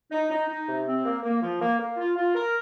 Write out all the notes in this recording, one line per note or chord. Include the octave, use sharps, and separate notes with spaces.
D#4
D#4
D#4
C3
C4
A#3
A#3
F3
A#3
A#3
F4
F4
A#4